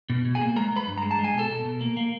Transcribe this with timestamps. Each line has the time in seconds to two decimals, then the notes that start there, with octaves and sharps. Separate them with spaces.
0.10 B2
0.25 B2
0.35 G#4 G#5
0.41 A#3
0.56 G#3 A#4 A#5
0.72 G#3 B4 B5
0.87 G2
0.98 G#3 A#5
1.11 A5
1.19 G#3
1.24 G#5
1.34 B2 A4 A5
1.50 B2
1.65 B2
1.81 A#3
1.97 A#3